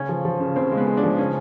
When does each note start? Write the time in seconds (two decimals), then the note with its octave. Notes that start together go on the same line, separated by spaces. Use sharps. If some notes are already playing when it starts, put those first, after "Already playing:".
Already playing: C#3 C#4
0.09 F3
0.25 F3
0.40 C#3
0.56 C#3 C4
0.72 G#3
0.77 B3
0.87 G#3
0.97 D4
1.03 F3
1.18 C#3 C#4